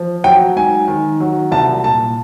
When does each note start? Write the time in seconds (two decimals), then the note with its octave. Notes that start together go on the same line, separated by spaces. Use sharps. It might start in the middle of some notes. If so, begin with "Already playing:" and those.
Already playing: F3
0.24 F#3 G5
0.56 G#2 G#5
0.88 D#3
1.20 F#3
1.52 C2 A5
1.84 A#2 A5